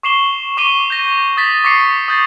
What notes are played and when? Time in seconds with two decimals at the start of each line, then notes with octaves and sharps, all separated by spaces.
0.03 C#6 D6 C7 E7 F#7 G7
0.57 C#6 D6 D#7 G7
0.90 G6 A#6 G7
1.37 D#6 A6 B6
1.64 C#6 D6 A#6 C7 C#7
2.08 D#6 G6 A6 C7